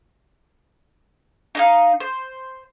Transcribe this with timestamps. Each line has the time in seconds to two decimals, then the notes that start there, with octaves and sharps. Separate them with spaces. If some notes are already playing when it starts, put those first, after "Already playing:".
1.55 D#4 D#5 F5
2.00 C5